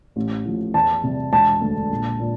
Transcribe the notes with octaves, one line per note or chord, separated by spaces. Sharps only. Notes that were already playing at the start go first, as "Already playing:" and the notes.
A1
A2 F3
E2 A5
C3 G3
E1 A5
D2 D3
A#1
A#2